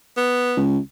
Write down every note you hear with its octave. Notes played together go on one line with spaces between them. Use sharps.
B3
C#2